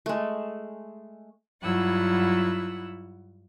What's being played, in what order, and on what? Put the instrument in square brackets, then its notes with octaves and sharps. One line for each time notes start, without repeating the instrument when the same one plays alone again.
[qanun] G#3 A3
[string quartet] G2 F#3 E4 F4 F#5 E6